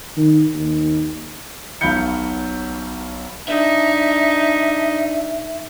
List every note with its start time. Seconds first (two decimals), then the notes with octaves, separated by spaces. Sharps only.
0.17 D#3
0.54 D#2
1.81 B1 F#3 F5 B5 G6 C#7
3.48 D4 D#4 E5